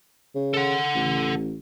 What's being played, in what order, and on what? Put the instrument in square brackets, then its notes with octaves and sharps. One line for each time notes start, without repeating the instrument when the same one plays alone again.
[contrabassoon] C#3
[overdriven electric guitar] A4 F#5
[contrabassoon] A1